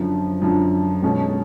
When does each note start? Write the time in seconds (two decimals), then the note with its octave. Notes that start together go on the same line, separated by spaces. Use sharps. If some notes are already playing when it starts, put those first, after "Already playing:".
Already playing: F#2 D3 F3
0.42 F#2 D3 F3
1.02 B1 B2 G#3 C#4